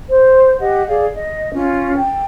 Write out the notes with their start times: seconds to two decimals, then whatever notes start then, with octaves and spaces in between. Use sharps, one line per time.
0.09 C5
0.60 G4 D#5 F#5
0.88 G#4 D5 F5
1.15 D#5
1.53 C#4 F4
1.99 G5 A5